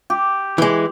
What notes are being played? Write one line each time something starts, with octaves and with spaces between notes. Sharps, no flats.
G4
E3 G#3